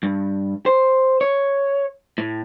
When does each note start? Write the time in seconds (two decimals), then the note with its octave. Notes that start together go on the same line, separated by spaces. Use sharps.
0.03 G2
0.66 C5
1.21 C#5
2.18 A2